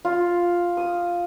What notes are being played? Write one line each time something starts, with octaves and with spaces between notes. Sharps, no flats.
F4
D#6